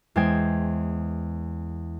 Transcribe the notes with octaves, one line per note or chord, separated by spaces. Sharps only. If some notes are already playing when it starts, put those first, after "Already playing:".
E2 G#3 C5 G5 G#6